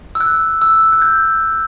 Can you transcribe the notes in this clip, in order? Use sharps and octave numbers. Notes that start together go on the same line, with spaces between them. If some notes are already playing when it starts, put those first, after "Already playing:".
E6
F#6
E6
F#6
G6